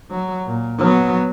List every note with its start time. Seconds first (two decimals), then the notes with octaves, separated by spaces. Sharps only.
0.11 F#3
0.47 A#2
0.79 F#3 B3